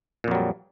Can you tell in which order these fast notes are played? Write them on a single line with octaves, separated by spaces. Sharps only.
A#2 F2 F#3 G3